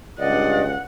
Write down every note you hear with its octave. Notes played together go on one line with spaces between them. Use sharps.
C#2 G2 D5 D#5 F#5